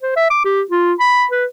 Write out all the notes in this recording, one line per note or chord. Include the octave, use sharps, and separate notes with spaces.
C5
E5
D6
G4
F4
B5
B4